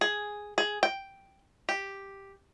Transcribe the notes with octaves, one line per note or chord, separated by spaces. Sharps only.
G#4
G#4
G5
G4